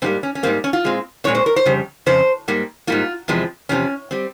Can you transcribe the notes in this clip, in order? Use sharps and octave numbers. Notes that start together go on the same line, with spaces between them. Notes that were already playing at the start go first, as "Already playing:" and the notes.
G#2 G3 A#3 C4
C#4
C#4
G#2 G3 A#3 C4
C#4
F4
A#2 G#3 C4
A#2 G#3 C4 C#5
C5
A#4
C5
F2 C#3 G3
F2 C#3 C5
G#2 G3 A#3
G#2 G3 A#3 F4
E2 C3 F3 G#3 C4
E2 C3 F3 C4 C#4
G3 C4